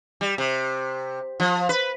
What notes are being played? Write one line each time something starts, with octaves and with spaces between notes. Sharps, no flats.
G3
C3
F3
B4